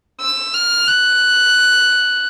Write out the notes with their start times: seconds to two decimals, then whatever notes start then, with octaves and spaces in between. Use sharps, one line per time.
0.21 E6
0.54 F6
0.88 F#6